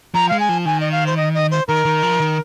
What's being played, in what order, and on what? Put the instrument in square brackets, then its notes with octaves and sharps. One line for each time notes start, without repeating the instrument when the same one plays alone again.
[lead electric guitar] F3 [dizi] A#5
[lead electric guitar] G#3 [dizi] F5
[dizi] G#5
[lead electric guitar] F3
[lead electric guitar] D#3 [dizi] G#5
[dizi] D#5
F5
C5
D#5
D#5
C5
[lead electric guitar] D#3 [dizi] A#4
[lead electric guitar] D#3
F3
D#3